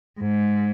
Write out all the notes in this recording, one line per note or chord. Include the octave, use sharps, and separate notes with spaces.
G#2